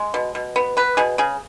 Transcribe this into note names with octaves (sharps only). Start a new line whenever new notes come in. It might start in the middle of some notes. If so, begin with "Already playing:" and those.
Already playing: G#3
B2
B2
B3
B3 B4
B2 G#4
C#3 G#4